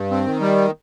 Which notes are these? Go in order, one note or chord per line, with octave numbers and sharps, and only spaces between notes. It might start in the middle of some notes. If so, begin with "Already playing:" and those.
Already playing: G2
C4
D#3
G3